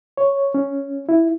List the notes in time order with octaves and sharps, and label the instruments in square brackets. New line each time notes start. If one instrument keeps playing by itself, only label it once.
[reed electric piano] C#5
C#4
E4